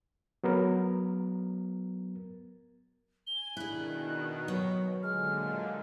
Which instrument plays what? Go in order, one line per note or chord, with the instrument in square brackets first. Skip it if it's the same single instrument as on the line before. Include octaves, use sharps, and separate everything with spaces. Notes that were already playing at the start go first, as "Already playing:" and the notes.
[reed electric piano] F#3 B3 A#4
[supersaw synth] G#5 [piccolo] G7
[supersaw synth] B2 D#3 [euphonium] D4 [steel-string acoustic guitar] E4 G#4 [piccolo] F#6
[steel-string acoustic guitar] F#3 [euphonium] B3
[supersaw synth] A#2 D3 [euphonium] G#3 [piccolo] F6